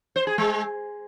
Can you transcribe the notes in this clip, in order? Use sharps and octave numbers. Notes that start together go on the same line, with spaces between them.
C5
G#4
G#3